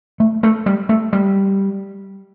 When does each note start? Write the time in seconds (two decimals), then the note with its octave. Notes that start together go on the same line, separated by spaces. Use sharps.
0.20 A3
0.43 A3
0.66 G3
0.89 A3
1.13 G3